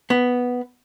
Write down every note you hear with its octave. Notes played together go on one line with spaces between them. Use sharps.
B3